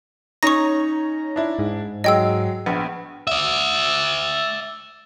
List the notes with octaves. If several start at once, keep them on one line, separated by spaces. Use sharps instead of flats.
C#4 D#4 C#5 A#5 C#6 A#6
D4 E4
G#2
F#3 G#3 D#5 G5 E6
A#1 B3
D5 E5